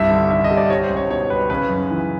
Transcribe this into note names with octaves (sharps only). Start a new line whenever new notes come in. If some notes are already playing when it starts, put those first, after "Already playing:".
Already playing: C2 G2 E5
D3
D3 E5
D#5
G3
D5
G3 C#5
C5
C#2
C#5
B2 C#5
G3 B4
C#3 B4
F#2
E3